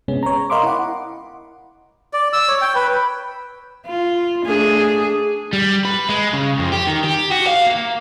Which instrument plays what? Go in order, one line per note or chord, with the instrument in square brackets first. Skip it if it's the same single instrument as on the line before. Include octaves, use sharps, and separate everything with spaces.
[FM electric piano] C3 G#3 B3 C#4
C#5 A#5
A#4 D#5 F5 B5 C6 D6
E4 F#5
[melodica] D5
E6
C#5
G5
B4
[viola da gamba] F4
A3 D4 G#4
[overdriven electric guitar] G3
B4
G#3
C#3
F2
G4
D#3
G4
F#4
F5
A#3